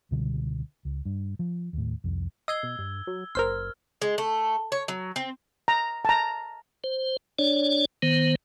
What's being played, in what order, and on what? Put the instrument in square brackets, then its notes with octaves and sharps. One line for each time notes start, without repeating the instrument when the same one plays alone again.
[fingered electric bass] C#2 B2 D3 G3
C#2
G2
F3
D#2 A2
C2 F2
[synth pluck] D#5 C7 [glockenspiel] E6 G#6 G7
[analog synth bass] B2
G2
F#3
[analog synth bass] F#1 [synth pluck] A#4 C5 C6 [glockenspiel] F6
[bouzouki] G#3
A3
C#5
F#3
C4
[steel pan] A#5
A5 A#5
[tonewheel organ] C5
D4 C#5 D5
D#3 B3 C5